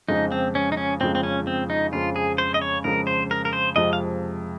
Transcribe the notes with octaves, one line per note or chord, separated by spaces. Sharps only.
F2 C#3 F3 G#3 D#4
C4
C#4
D#4
C#4
F2 C#3 F3 G#3 C4
C4
C#4
C4
D#4
F2 C#3 F3 G#3 F4
G#4
C5
D#5
C#5
F2 C#3 F3 G#3 A#4
C5
A#4
A#4
C5
F2 C3 F3 G#3 D#5
F5